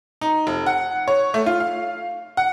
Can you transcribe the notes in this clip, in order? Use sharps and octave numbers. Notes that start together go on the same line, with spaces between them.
D#4
F1
F#5
C#5
A3
F4
F5
F#5